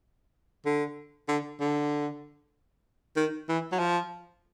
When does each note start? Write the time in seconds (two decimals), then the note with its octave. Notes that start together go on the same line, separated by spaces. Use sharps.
0.65 D3
1.28 D3
1.60 D3
3.16 D#3
3.49 E3
3.72 F#3
3.79 F3